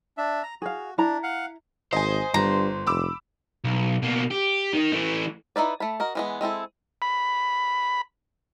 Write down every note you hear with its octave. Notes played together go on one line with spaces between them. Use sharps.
D4 E5
A#5
F#4 G#4 F5
D4 E4 A#5
F5 F#5
G#1 C5 D#5 G#5
G1 G2 A#5
F1 B5 D6 E6
B1
B2 A#3
G4
D#3 D#4
E3 A3
D#4 E4 B4 D5
A3 A5 B5
F#4 A#4 D#5
E3 G#3 B3
G#3 C4 E4 A4
B5